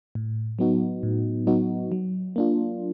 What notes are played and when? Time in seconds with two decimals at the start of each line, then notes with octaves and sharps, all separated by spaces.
0.15 A2
0.59 F#3 B3 D#4 F#4
1.03 A2
1.47 F#3 B3 D#4 F#4
1.92 F#3
2.36 A#3 D4 F4